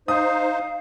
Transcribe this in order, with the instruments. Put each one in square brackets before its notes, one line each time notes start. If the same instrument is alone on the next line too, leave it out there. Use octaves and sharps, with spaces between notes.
[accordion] D#4 C5 [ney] F5 [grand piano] D#6